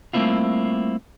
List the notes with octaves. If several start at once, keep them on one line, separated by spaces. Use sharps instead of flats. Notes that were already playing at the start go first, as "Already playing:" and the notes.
G3 A3 A#3 C4 E4 F4